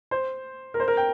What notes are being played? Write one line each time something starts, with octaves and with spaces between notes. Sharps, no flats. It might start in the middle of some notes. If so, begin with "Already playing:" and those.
C5
A#4
C5
A#4
G5